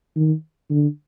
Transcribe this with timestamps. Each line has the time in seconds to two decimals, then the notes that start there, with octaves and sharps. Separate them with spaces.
0.16 D#3
0.70 D3